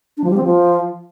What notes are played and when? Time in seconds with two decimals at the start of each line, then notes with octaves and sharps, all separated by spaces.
0.17 D4
0.24 F3
0.31 G3
0.37 C4
0.44 F3